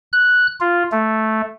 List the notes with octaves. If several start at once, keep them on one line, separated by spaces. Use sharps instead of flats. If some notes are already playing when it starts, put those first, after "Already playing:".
F#6
F4
A3